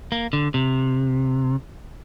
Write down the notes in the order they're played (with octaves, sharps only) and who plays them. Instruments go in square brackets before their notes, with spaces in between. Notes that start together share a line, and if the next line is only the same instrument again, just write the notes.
[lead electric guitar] A#3
D3
C3